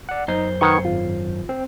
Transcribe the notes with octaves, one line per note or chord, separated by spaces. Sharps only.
D5 F#5
F#2 D#4 C5
D#3 B4 F#5 C#6 G#6 C#7
G#1 F4
C4